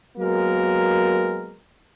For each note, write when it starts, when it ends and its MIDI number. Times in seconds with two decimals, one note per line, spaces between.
0.18 1.56 54
0.18 1.56 56
0.18 1.56 58
0.18 1.56 59
0.18 1.56 70